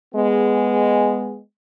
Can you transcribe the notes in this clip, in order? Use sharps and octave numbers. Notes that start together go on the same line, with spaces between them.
G#3 B3 G#4